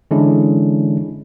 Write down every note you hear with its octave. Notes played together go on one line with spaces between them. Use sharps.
D3 E3 G#3 C#4 D4 E4